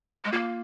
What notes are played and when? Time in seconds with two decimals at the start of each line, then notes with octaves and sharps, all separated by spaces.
0.24 G#3
0.32 A#3 F4